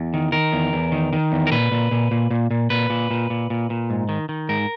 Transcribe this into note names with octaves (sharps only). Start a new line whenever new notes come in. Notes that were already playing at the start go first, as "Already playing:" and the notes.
Already playing: E2
D#3
D#3 A#4
E2
E2
D#3
D#3
E2
A#4
A#2 B4
A#2
A#2
A#2
A#2
A#2
A#2 B4
A#2
A#2
A#2
A#2
A#2
G#2
D#3
D#3
G#2 A#4